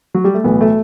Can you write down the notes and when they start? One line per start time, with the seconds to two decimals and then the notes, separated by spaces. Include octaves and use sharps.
0.14 F#3
0.24 G3
0.34 A3
0.44 B1 A2 E3 B3
0.61 A3